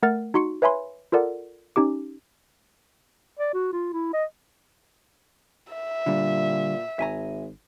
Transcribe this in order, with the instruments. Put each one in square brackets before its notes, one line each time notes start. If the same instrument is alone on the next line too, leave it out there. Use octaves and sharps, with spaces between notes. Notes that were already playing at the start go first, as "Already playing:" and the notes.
[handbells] A3 A#4 F#5 F6 A6
D#4 F#4 C6 C#6 C#7
B4 C#5 E5 G#5 B5 C6
F4 A4 A#4 D5 F#5
C#4 D#4 G4 D6
[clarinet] D5
F#4
F4
E4
D#5
[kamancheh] E5
[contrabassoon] A#2 [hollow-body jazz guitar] D3 G3
[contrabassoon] G#1 [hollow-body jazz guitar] E5 G#5 A#5